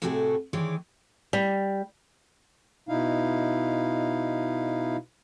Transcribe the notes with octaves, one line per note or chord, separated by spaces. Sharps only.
A2 C3 A3 F#4 G#4 A4
D#3 E3 G#3 G#4 C#5 D5
G3
B2 D#4 E4 F5